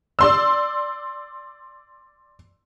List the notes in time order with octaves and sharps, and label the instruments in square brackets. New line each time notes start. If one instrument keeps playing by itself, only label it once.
[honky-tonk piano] D5 C6 E6